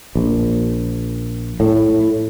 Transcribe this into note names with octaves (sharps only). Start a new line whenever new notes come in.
A#1
A2